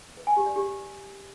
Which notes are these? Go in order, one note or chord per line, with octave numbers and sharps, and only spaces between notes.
B4
G#5
G4
D5
G4